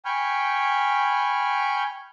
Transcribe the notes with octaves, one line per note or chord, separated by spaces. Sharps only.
G5 G#5 B5 C#6 F6 G6